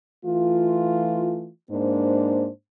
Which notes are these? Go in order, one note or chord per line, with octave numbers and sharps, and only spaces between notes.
E3 A3 F4
G#2 A#3 D4 C5